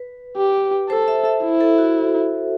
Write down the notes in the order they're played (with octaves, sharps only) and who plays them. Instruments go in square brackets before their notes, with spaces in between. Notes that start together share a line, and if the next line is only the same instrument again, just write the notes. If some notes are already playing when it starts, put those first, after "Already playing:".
Already playing: [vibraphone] B4
[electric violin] G4
[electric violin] A4 [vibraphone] C5
[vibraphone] E5
E5
[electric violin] E4
[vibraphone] A4
F#4